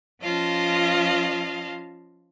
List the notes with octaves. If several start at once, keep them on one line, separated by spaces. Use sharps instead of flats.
F3 C#4 F4 D#5 F5 A5